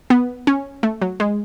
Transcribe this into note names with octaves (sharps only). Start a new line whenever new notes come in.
B3
C#4
A3
F#3
G#3